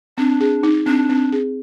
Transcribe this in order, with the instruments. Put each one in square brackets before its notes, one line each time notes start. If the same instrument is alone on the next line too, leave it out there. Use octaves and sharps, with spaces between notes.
[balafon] C4 [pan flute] D4
[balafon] G#4
D#4
[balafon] C4 [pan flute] D4
[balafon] C4
G#4